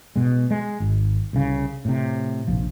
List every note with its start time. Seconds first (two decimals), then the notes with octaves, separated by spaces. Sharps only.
0.16 B2 G#3
0.51 G#3
0.80 G#1
1.33 C2 C#3
1.85 A2 C3
2.47 F1 A#1 F3